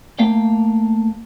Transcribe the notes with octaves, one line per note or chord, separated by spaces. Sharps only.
A3 A#3 F5 G5